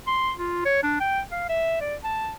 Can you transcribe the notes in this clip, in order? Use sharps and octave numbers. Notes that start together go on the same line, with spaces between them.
C6
F4
C#5
D4
G5
F5
E5
D5
A5